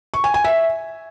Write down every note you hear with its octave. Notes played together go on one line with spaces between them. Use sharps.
C#6
G#5
G#5
E5